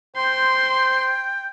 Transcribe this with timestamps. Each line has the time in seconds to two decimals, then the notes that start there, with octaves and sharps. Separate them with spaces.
0.16 C5 G5 C6